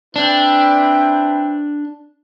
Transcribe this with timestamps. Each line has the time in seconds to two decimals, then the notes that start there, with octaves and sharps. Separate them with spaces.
0.15 C4 D4 E4 B4 E5 G5